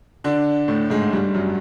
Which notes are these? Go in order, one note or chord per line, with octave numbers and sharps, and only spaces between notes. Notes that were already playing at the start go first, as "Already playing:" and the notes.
D3 D4
A2 A3
G#2 G#3
G2 G3
F#2 F#3